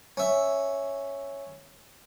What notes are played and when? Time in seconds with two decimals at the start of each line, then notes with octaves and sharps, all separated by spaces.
0.17 C#4 E5